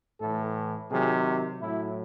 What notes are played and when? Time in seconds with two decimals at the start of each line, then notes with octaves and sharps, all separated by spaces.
0.20 A2 E3 A4
0.91 C3 D#3 F#3 G#4
1.61 A2 F#3 E4